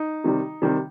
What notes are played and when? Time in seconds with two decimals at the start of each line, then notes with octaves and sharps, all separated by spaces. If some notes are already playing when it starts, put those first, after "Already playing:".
Already playing: D#4
0.24 C3 D#3 G3
0.62 C3 D#3 G3